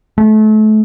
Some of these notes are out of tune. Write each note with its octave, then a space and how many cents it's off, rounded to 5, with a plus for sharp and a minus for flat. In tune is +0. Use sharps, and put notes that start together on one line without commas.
A3 -30